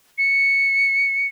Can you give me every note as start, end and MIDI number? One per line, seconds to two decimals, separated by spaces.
0.18 1.27 97